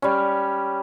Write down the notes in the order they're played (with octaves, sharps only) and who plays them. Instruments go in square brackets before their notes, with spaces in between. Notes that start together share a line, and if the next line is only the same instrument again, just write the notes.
[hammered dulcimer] G3 C#4